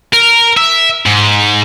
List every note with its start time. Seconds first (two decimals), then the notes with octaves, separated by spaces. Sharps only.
0.13 A#4
0.57 E5
1.06 G#2